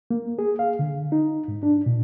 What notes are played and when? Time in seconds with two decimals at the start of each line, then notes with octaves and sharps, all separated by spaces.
0.11 A#3
0.39 G#4
0.59 F5
0.79 D3
1.12 D#4
1.48 G#2
1.63 D4
1.86 A#2